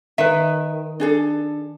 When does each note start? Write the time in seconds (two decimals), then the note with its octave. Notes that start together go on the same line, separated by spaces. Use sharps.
0.18 D#3 B4 E5
1.00 D4 G#4 A4